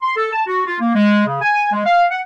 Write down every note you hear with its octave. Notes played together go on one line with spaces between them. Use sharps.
C6
A4
A5
F#4
F4
A#3
G#3
C#3
G#5
G#3
F5
F#5